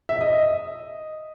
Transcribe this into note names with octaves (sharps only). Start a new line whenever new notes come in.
E5
D#5